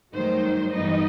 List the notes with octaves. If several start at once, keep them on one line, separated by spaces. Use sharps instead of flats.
G2 D#3 F#3 A3 D#4 C5
G2 E3 G3 B3 D#4 D#5